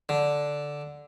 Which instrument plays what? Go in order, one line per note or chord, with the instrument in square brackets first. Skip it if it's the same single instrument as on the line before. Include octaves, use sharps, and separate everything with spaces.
[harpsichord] D3